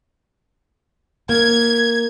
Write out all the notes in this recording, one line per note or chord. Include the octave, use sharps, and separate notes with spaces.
A#3 G#6